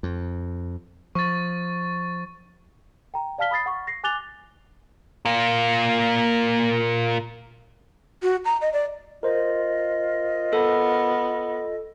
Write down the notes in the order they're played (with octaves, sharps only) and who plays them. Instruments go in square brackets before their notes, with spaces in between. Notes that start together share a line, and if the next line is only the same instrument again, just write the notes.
[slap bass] F2
[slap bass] F3 [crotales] C#6 A6
[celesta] G5 A#5
D5 F5 A5 F6 B6 G7
B5 D#6 A6 C7
F#5 C#6
A#6 C7
G#5 D6 F#6 A6 F7 G7
[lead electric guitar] A#2 A#3
[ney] F#4
A#5
D#5
D5
[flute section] F4 D#5 [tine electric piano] A#4 C5
[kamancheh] B3 [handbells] A4